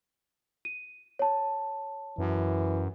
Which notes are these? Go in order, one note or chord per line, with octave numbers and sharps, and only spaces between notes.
D#7
C#5 A5
F#2 E3